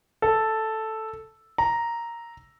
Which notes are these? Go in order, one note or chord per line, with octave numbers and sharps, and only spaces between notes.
A4
A#5